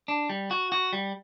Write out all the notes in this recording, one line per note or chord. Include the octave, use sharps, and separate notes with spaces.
D4
G3
F#4
F#4
G3